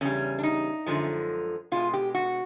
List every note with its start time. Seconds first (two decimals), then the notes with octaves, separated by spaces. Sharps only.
0.01 E2 C#3 G3 C#4
0.39 D4
0.43 D#4
0.86 F#2 D3 F3 G#3
1.72 B2 G#3 F4
1.94 G4
2.15 F#4